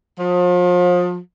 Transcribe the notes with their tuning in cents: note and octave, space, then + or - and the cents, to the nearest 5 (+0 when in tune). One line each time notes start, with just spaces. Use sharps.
F3 +35